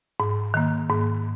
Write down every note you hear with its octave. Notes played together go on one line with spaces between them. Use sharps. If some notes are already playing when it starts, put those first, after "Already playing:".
G#2
D#3 A#3
G#2